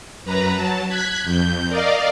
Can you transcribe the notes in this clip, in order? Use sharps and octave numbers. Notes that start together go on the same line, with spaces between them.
F#2 B4 A#5
F#3 A5
F#6 G#6 B6
F2 G6
A#4 D5 D#5 F5